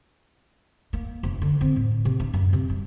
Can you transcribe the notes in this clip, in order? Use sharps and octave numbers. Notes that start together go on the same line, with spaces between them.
A#3
F1
D3
C4
A2
C3
D4
F#2
C3
G3